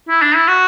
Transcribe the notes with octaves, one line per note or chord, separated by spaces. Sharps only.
E4
D4
E4
F#4